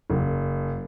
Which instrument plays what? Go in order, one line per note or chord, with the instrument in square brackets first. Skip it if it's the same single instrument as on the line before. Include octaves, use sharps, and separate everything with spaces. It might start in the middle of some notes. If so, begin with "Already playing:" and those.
[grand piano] F#1